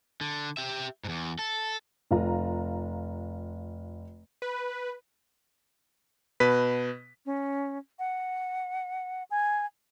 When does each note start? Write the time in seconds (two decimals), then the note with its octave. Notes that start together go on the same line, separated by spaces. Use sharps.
0.21 D3
0.57 G4 E5
1.04 E2 G#2
1.39 A4
2.11 F1 F4 A#5
4.42 B4
6.40 B2 B4 B6
7.25 C#4
7.99 F#5
9.30 G#5